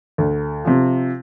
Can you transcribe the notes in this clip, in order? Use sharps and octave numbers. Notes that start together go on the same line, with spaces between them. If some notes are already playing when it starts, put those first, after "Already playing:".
D2
C3 F3